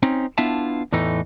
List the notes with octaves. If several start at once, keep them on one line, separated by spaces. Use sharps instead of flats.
C4 C#4 D#4
B3 D4 E4 F4 E5 A5
E2 A2 E3 A3 D#4